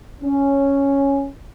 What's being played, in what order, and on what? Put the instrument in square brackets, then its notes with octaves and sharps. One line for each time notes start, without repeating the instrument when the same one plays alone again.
[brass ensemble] C#4